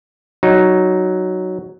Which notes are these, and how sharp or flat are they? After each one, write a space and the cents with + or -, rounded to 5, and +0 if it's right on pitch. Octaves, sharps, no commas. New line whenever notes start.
F#3 +0 D#4 +0